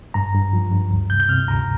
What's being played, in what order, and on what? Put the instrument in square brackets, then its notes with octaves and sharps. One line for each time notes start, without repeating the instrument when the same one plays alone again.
[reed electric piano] G2 A#5
G2
F3
G2
D2
C3 G6
G6
C3 F6
D2 A#5